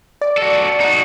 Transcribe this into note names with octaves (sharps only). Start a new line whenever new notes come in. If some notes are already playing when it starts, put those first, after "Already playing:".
D5
F#4 A4
D#4 F#4